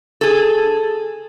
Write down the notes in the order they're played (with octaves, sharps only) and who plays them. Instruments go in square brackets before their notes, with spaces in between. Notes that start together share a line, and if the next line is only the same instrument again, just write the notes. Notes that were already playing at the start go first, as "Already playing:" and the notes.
[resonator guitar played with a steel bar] G#4 A4